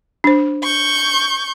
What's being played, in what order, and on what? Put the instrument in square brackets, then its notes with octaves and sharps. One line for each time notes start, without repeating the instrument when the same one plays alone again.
[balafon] D4 C5
[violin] C#6 G6